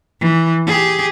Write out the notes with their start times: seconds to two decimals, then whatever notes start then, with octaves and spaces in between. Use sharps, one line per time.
0.21 E3
0.67 G4 G#4